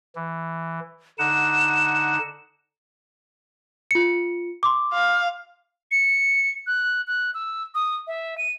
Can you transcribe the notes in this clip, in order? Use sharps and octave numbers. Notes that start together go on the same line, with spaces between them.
E3
D3 D#4 F#5 E7
F4 C#7
C6 D6
F5
C#7
F#6
F#6
E6
D#6
E5
D#7